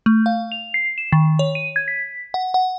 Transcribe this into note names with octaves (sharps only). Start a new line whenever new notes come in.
A3
F5
F7
C7
E7
D#3
C#5
D#7
G#6
B6
F#5
F#5